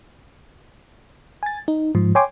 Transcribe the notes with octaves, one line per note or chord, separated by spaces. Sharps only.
G#5 A6
D#4
G#2 F3
C#5 G5 G#5 C6 D6